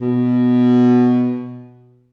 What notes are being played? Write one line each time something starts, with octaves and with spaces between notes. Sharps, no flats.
B2